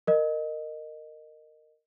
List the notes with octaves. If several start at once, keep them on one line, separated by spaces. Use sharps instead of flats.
A#4 D#5